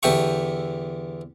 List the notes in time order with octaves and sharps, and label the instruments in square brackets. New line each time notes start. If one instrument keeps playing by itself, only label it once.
[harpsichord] E2 D3 G4 E5 C#6